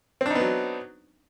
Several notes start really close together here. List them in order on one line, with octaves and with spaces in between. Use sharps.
C4 D4 D#4 B3 F#3